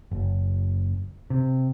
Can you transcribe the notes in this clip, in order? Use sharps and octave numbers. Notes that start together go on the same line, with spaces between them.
F#1
C3